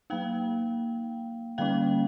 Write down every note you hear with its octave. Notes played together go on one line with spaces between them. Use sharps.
F#3 A#3 D#4 F5 G5
D3 G3 A#3 C#4 F5 G5